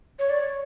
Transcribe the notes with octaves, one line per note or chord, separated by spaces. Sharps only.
C#5
D5
C#5